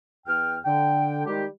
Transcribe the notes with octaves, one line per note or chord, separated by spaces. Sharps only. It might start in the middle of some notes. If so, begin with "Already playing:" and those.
E2 G5 F6
D3 G5
D#3 G3 G#3 G4